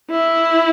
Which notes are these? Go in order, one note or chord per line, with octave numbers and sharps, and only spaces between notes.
E4